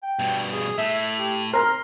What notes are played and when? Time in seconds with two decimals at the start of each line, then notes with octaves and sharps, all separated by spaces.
0.03 G5
0.19 G2 B2
0.52 G#4
0.78 A2 E5
1.19 G4
1.53 A#4 A#5 C6 F6